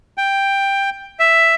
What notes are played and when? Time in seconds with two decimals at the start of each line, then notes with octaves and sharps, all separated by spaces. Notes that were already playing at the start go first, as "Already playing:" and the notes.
0.18 G5
1.20 E5